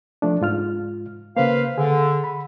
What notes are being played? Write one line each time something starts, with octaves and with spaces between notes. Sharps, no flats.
F3 A3 D4
G#2 F4 F6
C#3 A#3 B4 C5 F5
D3 G#4
B5